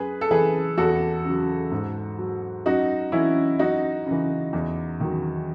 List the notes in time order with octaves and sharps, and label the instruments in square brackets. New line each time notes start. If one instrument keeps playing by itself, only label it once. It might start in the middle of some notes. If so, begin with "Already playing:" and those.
Already playing: [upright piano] F#2 G#4 B4
A4
E3 G#4 B4
E2 F#4 A4
C#3 F#3
G#2
F#3
F#2 D#4 F#4
E3 C#4 E4
F#2 D#4 F#4
C#3 E3
E2
D#3 F#3